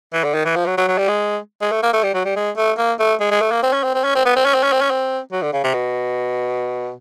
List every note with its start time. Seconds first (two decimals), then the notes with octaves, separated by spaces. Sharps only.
0.13 E3
0.24 D3
0.34 D#3
0.45 E3
0.56 F3
0.66 F#3
0.77 F#3
0.88 F#3
0.98 G3
1.08 G#3
1.61 G#3
1.72 A3
1.82 A#3
1.93 A3
2.04 G3
2.14 F#3
2.25 G3
2.36 G#3
2.57 A3
2.78 A#3
2.99 A3
3.20 G#3
3.31 G#3
3.41 A3
3.51 A#3
3.62 C4
3.73 C#4
3.83 C4
3.94 C4
4.04 C#4
4.15 C4
4.25 B3
4.36 C4
4.45 C#4
4.54 C4
4.63 C#4
4.72 C4
4.81 C#4
4.90 C4
5.32 F#3
5.42 D3
5.53 C#3
5.63 C3
5.74 B2